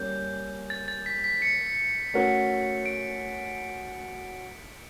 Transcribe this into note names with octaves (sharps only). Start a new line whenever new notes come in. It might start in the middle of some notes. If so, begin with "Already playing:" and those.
Already playing: G3 A#3 C#4 G6
A6
A6
B6
B6
C#7
A3 C#4 F#4 A#4
D7